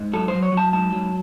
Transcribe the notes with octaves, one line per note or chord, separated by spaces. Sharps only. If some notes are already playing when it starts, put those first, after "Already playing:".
Already playing: G#2
F#3 A4
F#3 C5
C#5
F#3
A5
G#2 A5
F#3